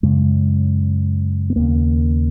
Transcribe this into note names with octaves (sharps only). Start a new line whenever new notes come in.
F#2 C#3 G#3
B3
D#2 C#3 A#3